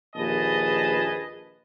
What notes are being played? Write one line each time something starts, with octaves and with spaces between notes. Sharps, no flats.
A#1 D#2 G#4 B4 D#5 A5